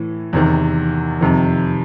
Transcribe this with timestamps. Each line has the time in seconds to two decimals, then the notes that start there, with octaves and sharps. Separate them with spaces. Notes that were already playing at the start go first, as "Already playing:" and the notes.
Already playing: A2 E3
0.33 E2 C3 D#3
1.21 F2 C3 D#3